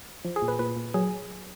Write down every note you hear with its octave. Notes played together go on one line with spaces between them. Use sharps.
F3
G#4
A#2
B4
A#2 B4
A#2
F#3 G#4